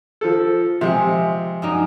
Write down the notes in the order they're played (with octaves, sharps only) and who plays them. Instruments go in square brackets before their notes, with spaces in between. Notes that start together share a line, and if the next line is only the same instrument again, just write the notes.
[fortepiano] F3 A4
[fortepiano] C3 [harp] F3 G#3 C#7
[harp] F#2 D4 D#4